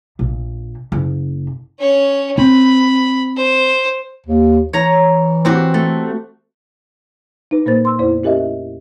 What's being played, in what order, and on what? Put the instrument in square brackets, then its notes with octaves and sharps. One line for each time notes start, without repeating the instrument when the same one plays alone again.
[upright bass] A#1
F#1
[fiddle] C#4 C#5
[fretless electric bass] C4 [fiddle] B5
[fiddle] C5
[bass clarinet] D#2
[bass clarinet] E3 [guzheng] C#5 A#5
[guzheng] C4 F#4 G4
A3
[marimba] D#4 B4
A#2 A#3 A#4 C5 A6
C6 E6
F2 B3 E4 C5 D5
C#4 G4 A#4 D#5 E5